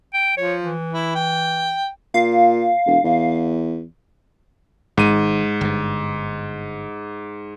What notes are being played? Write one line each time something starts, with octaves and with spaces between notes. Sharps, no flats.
G5
F3 C#5
E3
E4
G5
A#2 F5
E1
E2
G#1 G#2 D#3 D#7
G1 G2